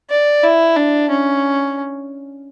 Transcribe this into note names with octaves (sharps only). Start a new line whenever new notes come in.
D5
E4
D4
C#4